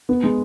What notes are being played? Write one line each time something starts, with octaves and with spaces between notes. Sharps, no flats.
B3
G#3